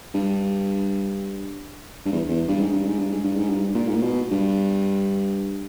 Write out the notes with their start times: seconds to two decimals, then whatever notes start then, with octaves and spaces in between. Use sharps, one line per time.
0.14 G2
2.05 G2
2.12 E2
2.28 E2
2.48 G2
2.60 G#2
2.73 G2
2.86 G#2
2.99 G2
3.12 G#2
3.24 G2
3.37 G#2
3.49 G2
3.75 A#2
3.88 G#2
3.96 A#2
4.03 B2
4.31 G2